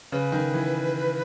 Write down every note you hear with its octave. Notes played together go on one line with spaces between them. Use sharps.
C#3 B4
D#3
E3